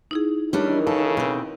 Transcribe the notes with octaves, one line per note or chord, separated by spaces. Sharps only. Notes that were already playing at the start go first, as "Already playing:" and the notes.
D#4 E4 G#4
D#3 E3 G3 C#4 D4
C#3 A4
B2 C4